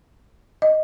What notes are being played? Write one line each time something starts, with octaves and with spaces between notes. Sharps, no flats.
D#5